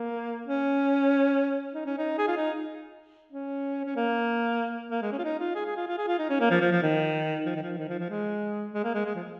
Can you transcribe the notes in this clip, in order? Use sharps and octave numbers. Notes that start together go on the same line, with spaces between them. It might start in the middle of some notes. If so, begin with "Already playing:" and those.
Already playing: A#3
C#4
D#4
C#4
D#4
G#4
F4
D#4
C#4
C#4
A#3
A#3
G#3
C#4
F4
D#4
F4
G#4
G#4
F4
F4
G#4
F4
D#4
C#4
A#3
F3
F3
F3
D#3
F3
D#3
F3
D#3
F3
F3
G#3
G#3
A#3
G#3
G#3
F3